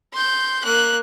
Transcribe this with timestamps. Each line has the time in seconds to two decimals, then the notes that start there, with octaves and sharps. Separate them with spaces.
0.13 C6 G6
0.64 A#3 F#6